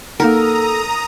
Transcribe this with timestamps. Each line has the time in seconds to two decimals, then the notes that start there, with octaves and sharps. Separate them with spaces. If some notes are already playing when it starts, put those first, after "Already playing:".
0.20 A#3 D#4 A4 A#4 F#5 A#5 D#6